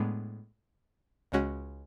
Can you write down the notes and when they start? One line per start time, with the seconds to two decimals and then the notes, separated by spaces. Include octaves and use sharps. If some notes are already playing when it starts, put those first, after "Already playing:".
Already playing: A2 G#3 B3 D4
1.32 C#2 C#3 G#3 C#4 F#4